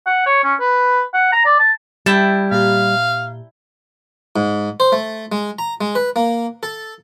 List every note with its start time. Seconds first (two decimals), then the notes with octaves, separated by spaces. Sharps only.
0.06 F#5
0.26 C#5
0.44 C#4
0.60 B4
1.14 F#5
1.32 A#5
1.45 D5
1.59 A5
2.06 G3 E4 G5 A5
2.51 A#2 G4 F5
4.36 G#2
4.80 C5
4.92 A3
5.32 G#3
5.59 A#5
5.81 G#3
5.95 B4
6.16 A#3
6.63 A4